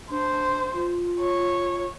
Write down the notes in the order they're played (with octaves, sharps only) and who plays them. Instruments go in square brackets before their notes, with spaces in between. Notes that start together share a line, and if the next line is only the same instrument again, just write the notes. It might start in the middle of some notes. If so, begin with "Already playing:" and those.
[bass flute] D4 [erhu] C5
[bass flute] F4
[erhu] C#5